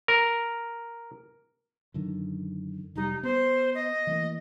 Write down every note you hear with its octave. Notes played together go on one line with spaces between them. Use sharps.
A#4
F#2 D3 D#3
F1 G3 D#4
B3 C5
D#5
E3 A3 A#3